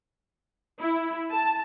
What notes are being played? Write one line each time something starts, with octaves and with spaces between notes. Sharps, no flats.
E4
A5